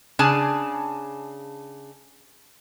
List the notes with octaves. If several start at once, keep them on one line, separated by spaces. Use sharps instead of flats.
C#3 D4 G#4 G#5 A5